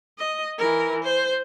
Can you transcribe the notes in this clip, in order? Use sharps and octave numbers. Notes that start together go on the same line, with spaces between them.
D#5
E3 A#4
C5